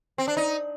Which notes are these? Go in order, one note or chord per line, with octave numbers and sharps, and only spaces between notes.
C4
D4
D#4